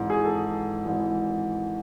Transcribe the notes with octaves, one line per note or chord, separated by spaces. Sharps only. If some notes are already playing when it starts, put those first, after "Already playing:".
Already playing: G#1 G#2 E3
G#4
A4
G#1 G#2 E3